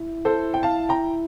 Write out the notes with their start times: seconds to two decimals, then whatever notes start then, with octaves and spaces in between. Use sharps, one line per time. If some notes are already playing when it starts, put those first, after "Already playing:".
Already playing: E4
0.25 A4 C5
0.54 G5
0.63 F5 A5
0.89 G5 A#5